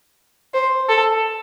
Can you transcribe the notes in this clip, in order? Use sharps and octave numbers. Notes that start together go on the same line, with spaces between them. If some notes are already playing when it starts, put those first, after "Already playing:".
C5
A4